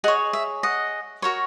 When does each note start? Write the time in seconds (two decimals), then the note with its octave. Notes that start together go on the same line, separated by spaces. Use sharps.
0.04 G#4 D#5 F#5
0.08 C#5
0.33 E5
0.63 D#5 F#5
1.22 F#4 A#4 C#5